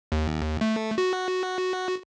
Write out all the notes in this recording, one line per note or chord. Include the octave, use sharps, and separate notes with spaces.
D#2
A3
F#4